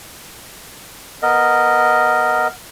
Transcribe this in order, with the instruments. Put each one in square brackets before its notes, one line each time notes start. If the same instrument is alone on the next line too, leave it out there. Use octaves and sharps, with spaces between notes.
[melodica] B3 A#4 D#5